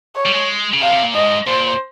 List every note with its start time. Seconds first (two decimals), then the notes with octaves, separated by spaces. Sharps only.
0.16 C#5
0.25 G3
0.32 G#3
0.73 C#3
0.82 C3 F5
0.92 C3
1.03 A#2
1.14 G#2 D#5
1.47 A#2 C5